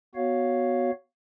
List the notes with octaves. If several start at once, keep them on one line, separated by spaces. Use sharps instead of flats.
B3 F#4 C#5 F5